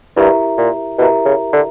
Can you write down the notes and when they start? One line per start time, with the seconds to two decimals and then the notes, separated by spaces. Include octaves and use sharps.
0.17 G2 E4 G4 A#4 E5 A#5
0.57 A#2
0.98 B2 E4 G4 A#4 E5 A#5
1.25 C#3
1.53 D3